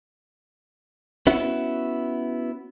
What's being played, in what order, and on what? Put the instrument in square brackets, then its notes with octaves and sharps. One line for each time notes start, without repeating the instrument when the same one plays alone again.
[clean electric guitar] B3 C#4 E4 F#4